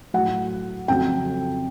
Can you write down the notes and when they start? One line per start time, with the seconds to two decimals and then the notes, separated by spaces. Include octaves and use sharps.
0.14 A2 F#3 F#5
0.88 F2 C#3 F#3 G5